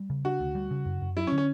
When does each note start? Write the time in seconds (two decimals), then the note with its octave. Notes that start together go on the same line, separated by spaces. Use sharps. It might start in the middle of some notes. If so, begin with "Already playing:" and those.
Already playing: G3
0.10 C#3
0.25 D4 F#4
0.40 D2
0.55 G3
0.71 C#3
0.86 F#2
1.01 F#2
1.17 F#3 E4
1.27 C#4
1.32 D3
1.38 C#4